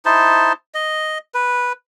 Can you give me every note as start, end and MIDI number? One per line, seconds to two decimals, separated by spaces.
0.05 0.53 63
0.05 0.53 64
0.05 0.53 72
0.05 0.53 81
0.75 1.18 75
1.35 1.73 71